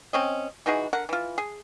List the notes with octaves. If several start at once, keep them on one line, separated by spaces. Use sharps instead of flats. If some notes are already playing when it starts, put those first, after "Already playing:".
C4 C#4 D#5
E3 D#4 F#4 G#4
D3 A#4 F#5
E3 F4
G#4